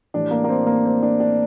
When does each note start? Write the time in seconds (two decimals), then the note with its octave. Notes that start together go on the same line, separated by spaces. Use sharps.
0.14 A2 E3 G3 D4
0.31 A#3
0.44 A#3
0.49 C4
0.67 A#3
0.85 C4
1.03 D4
1.20 D4